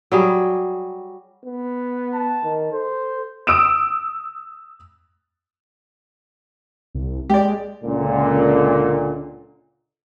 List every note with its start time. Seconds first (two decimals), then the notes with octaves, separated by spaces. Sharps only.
0.12 F#3 G3 G#4
1.46 B3
2.14 A5
2.43 D#3
2.72 A4 C5
3.47 D#6 E6 D7 E7
6.95 C2
7.30 G#3 G4 D5
7.84 C#2 A#2 D3